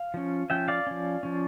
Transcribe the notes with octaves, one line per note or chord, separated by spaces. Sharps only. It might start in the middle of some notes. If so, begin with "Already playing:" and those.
Already playing: F5
F3 C#4
F3 C#4 E5 G5
D5 F5
F3 C#4
F3 C#4